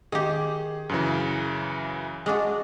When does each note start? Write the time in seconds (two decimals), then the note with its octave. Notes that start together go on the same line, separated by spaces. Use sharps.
0.12 D#3 G4 G#4
0.89 F#2 C#3 E3
2.26 G#3 D4 F#4